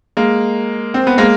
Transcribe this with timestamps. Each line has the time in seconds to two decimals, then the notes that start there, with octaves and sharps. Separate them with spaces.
0.17 G#3 A#3
0.94 C4
1.07 B3
1.18 G#3 A#3